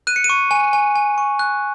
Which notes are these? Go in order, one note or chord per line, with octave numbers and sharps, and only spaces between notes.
F#6 D#7
C#7
D#7
C#6
G#5
G#5
G#5
C#6
F#6